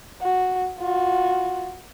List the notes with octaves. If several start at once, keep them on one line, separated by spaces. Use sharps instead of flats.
F#4
F4 F#4